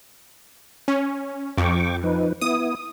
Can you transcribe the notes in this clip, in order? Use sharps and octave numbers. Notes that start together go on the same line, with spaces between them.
C#4
F2 G5 C#6 D6
F3 D#4 B4
B3 E4 D#6